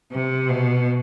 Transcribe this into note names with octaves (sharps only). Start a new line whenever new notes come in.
C3
B2